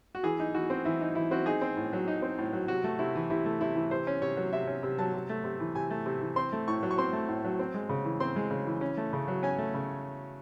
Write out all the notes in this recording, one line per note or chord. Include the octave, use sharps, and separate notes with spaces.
F#4
E3 G#4
D#4
E3 F#4
C4
E3 E4
D#4
E3 E4
C4 F#4
D#4 G#4
C4
A2
F#3
D#4
C4
A2
F#3
C3 F#4
A3
C3 E4
E3
C3 E4
A3
C3 E4
E3
C3 C5
C#4
C3 C#5
F#3
C3 E5
C#4
C3
F#3 A5
C3
A3
C3
E3
C3 G#5
A3
C3
E3
C4 C6
A3
A2 C#6
F#3
C#6
C4 C6
A3
A2
F#3
C4
G#3
C#3
E3
C4 C6
G#3
C#3
E3
C#4
A3
C#3
F#3
C#4 G#5
A3
C#3